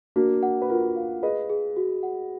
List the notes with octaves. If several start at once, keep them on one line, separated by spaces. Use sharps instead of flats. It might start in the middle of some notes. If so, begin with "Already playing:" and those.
A#3 D4 F#4
F#5
B4
F4 F#4 A#4
F5
G#4 B4 D#5
G#4
F#4
F#5